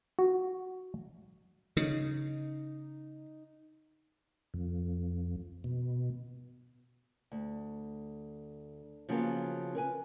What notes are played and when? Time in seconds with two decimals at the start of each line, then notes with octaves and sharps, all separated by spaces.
0.19 F#4
1.77 C#3 D#4
4.54 F2
5.64 B2
7.32 D2
9.09 C#3 F3 F#3 A#3 B3 C#4
9.75 A#4 B4 G#5